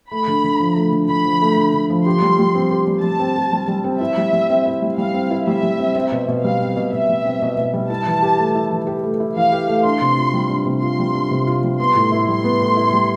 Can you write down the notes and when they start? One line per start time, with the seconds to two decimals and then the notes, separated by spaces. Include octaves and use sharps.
0.11 A3 B5
0.27 D3
0.44 D3
0.60 F3
0.76 A3
0.92 D3
1.09 D3 B5
1.25 F3
1.42 A3
1.58 D3
1.74 D3
1.90 F3
2.06 G4 C6
2.22 G3
2.39 G3
2.55 C4
2.71 G4
2.87 G3
3.03 G3 A5
3.20 C4
3.36 G4
3.53 G3
3.68 G3
3.84 C4
4.01 E4 E5
4.17 G3
4.33 G3
4.50 C4
4.66 E4
4.82 G3
4.97 G3 F5
5.14 C4
5.31 E4
5.46 G3 E5
5.63 G3
5.80 C4
5.95 C4
6.12 B2
6.28 B2
6.43 G3 F5
6.60 C4
6.76 B2
6.92 B2 E5
7.09 G3
7.25 C4
7.42 B2
7.57 B2
7.73 G3
7.90 E4 A5
8.06 E3
8.23 G4
8.38 A3
8.55 E4
8.71 E3
8.87 G4
9.04 A3
9.20 E4
9.36 E3 F5
9.52 G4
9.68 A3
9.84 D4 C6
10.01 C3
10.17 F4
10.34 G3
10.50 D4
10.66 C3
10.82 F4 C6
10.99 G3
11.14 D4
11.31 C3
11.47 F4
11.64 G3
11.79 B3 C6
11.95 A2
12.12 E4
12.28 G3 C6
12.44 B3
12.61 A2
12.77 E4
12.93 G3